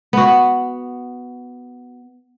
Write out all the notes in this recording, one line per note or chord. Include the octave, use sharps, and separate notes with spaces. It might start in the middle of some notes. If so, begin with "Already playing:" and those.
B3 F#4